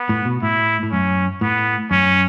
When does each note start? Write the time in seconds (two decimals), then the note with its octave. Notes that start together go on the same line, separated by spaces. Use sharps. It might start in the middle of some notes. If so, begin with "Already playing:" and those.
Already playing: B3
0.09 A2
0.25 B2
0.42 A2 E4
0.83 A2
0.92 F#2 C#4
1.41 A2 B3
1.91 F#2 C#4